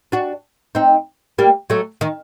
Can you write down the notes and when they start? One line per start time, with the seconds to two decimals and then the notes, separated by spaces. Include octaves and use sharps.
0.12 D4 F#4
0.75 C4 D#4
1.38 G3 A#3
1.70 F#3 A3
2.01 D#3